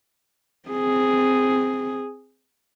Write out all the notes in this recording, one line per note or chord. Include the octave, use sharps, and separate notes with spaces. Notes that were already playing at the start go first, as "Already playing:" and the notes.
C4 G#4